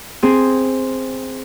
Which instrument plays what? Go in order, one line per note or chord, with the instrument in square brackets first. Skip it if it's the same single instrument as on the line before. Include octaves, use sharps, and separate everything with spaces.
[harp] C4 G#4 C5